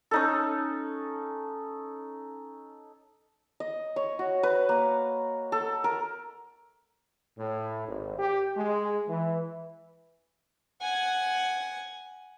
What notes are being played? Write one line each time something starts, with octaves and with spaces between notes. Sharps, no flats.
C#4 D#4 A4
D#5
C#5
F#4
B4
A#3
A4
A#4
A2
G#1
G4
G#3
E3
F#5 G#5